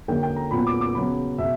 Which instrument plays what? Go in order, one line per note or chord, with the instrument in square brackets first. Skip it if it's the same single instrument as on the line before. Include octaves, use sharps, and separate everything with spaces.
[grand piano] D3 F#3 A#3 G5
G5
A#5
A#2 F#3 B3 B5
D6
D6
C#3 F#3 B3 B5
B2 E5